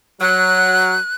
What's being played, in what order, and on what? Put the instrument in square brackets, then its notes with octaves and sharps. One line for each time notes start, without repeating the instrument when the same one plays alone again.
[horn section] F#3 [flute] F#6